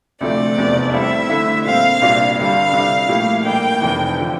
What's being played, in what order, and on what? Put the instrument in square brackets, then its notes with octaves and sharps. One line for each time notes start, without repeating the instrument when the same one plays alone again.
[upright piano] D2 C3 F3 A3 C4 [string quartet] D5
[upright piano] F1 E2 C3 F3
[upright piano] A2 G3 C4 E4 A4 [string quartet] E5
[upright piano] D3 A3 E4
[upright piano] A#2 G3 C4 [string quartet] F5
[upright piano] C2 A#2 G3 D4 F4
[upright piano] G2 D3 G3 [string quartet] F5
[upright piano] C2 C3 G3
A#2 F3 A3 E4 G4
[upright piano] A#1 A2 G3 A#3 [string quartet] G5
[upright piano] F1 F2 E3
D3 F3